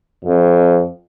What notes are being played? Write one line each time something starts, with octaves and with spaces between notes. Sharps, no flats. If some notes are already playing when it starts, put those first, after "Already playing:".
F2